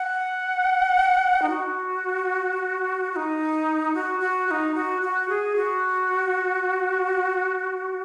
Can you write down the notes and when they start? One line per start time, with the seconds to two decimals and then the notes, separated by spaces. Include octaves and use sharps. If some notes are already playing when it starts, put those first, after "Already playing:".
Already playing: F#5
1.42 D#4
1.50 F#4
3.12 F#4
3.16 D#4
3.94 F#4
4.20 F#4
4.47 F#4
4.51 D#4
4.75 F#4
5.02 F#4
5.29 G#4
5.56 F#4